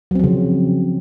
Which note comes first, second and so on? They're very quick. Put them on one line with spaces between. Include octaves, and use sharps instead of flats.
F#3 C4 F3 C#3